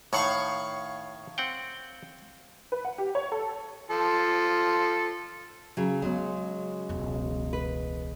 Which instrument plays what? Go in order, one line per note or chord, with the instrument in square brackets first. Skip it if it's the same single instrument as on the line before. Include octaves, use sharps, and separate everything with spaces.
[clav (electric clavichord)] A2 D#3 F#5 [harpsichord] C#5 F5 C#6
[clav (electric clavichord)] C4 F#5 G5
[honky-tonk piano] B4
F#5
G4
C#5
A4
[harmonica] F3 A4
[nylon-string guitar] C#3 F#3
[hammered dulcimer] C#3 G#3 [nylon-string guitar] F#3 [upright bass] B3 C#4
[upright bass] E1 C#2
[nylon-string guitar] B4